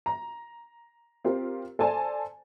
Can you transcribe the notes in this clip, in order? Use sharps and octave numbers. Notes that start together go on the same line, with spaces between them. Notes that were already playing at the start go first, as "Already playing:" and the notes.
A#5
C4 F4 G4 A#4 C5
A4 C5 D5 G#5 A5